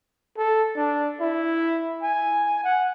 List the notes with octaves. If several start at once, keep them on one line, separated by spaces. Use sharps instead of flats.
A4
D4
E4
G#5
F#5